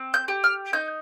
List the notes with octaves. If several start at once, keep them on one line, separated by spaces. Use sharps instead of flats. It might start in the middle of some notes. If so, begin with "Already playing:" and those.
Already playing: C4
G6
G4
F6
D#4 G6